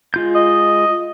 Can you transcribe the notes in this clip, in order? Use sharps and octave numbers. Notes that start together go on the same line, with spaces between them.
G#3 F4 G6
D#5